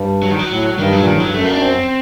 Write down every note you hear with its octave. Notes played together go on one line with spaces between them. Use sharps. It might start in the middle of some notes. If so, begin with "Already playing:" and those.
Already playing: G2
F#3
D#3
F#3
A2
G2 D#3
F#3
A#2
D#3
A2
G2 F#3
F#2 A3
A#3
D4
C4